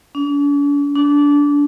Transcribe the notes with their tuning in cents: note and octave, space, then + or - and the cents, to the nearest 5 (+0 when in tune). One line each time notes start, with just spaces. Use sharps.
D4 -45
D4 -20